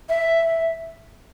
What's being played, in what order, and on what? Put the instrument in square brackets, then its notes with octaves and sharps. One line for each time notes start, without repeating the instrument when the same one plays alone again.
[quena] E5